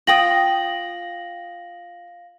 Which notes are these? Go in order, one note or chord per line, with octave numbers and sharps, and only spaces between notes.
F4 F5 G5 D#6 A#6 F#7